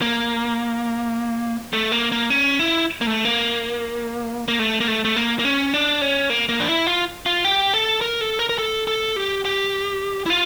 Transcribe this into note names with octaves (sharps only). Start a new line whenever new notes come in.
A#3
A3
A#3
A#3
C#4
E4
A#3
A3
A#3
A#3
A3
A#3
A3
A3
A#3
A#3
C#4
D4
C#4
A#3
A#3
D4
E4
F4
F4
G4
A4
A#4
A4
A#4
A#4
A4
A4
G4
G4
E4
F4